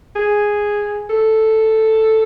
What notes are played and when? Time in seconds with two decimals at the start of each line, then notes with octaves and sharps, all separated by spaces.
0.16 G#4
1.10 A4